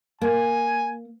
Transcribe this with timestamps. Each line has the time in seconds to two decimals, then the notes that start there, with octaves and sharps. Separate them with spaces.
0.22 A#3 G#5